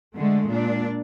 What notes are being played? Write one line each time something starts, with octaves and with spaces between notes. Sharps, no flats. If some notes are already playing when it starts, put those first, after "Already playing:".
D3 G#3 A3
A#2 D4